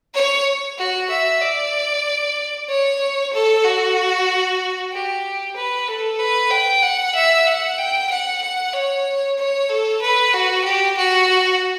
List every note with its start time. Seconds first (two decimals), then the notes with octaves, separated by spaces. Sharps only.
0.14 C#5
0.78 F#4
1.10 E5
1.41 D5
2.69 C#5
3.33 A4
3.64 F#4
4.92 G4
5.56 B4
5.88 A4
6.19 B4
6.50 G5
6.82 F#5
7.15 E5
7.46 F#5
7.78 G5
8.10 F#5
8.41 F#5
8.73 C#5
9.38 C#5
9.69 A4
10.01 B4
10.33 F#4
10.64 G4
10.97 F#4